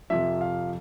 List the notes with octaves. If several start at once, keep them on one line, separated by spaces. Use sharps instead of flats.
F2 C3 F3 E5
F5